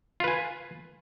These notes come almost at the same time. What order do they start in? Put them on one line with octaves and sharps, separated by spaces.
F4 B4 G#5